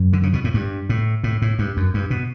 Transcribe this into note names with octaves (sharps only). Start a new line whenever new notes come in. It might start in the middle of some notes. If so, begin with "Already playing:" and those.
Already playing: F#2
D3
C#3
B2
A2
G2
A2
A2
A2
G2
F#2
G2
B2